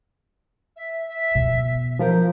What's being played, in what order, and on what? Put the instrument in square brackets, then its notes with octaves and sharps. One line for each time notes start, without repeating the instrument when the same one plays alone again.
[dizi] E5
E5
[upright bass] B2
[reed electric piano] F3 F4 A#4 [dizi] C5